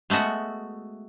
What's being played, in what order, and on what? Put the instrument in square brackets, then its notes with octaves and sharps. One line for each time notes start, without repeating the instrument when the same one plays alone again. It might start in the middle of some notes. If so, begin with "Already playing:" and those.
[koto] G#3 A3 B3 F#4 E5